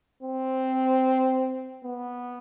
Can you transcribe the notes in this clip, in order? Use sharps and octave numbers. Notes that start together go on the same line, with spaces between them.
C4
B3